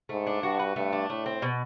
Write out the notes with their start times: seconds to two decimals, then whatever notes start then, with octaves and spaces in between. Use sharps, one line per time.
0.09 G#2 A3
0.27 D4
0.42 G2 F#4
0.59 B4
0.76 G2 A3
0.93 D4
1.10 A2 A3
1.26 C4
1.42 B2